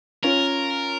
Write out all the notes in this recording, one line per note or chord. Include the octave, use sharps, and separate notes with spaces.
C#4 F4 A#4